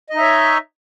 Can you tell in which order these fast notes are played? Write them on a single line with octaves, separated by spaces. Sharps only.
D#5 D#4 E5 C#5